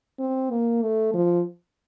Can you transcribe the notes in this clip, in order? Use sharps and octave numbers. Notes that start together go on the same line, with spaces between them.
C4
A#3
A3
F3